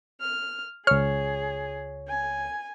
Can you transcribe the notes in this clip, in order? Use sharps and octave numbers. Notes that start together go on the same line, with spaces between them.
F6
C#2 G#4 C#5 F6
G#5